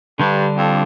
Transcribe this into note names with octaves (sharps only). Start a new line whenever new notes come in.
G2 D3 G3 D4
F2